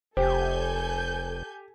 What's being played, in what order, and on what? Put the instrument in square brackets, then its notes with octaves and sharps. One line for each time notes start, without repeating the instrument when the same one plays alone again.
[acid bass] F1 [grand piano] G4 [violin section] A4 G#5 G6 [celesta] C5